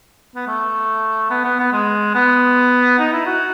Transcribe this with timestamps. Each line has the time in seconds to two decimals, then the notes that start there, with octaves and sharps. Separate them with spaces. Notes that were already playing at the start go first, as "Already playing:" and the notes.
0.35 B3
0.47 A3
1.30 B3
1.44 B3
1.59 B3
1.73 G#3
2.15 B3
2.99 D#4
3.13 E4
3.26 F#4